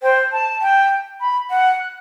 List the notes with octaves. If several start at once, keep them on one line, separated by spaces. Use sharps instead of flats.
C5 G5
A5
G5
B5
F#5
F#6